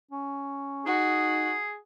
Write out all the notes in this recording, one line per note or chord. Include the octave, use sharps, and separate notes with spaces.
C#4
D#4 F#4 G#4